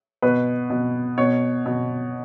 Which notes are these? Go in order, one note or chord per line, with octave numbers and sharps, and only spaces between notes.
B2 B4
B2
B2 C#5
B2